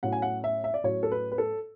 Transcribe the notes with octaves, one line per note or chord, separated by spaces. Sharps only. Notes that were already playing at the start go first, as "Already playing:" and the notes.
A2 F#3 C#4 F#5
G#5
F#5
E5
E5
D5
A2 F#3 C#4 C#5
A4
B4
B4
A4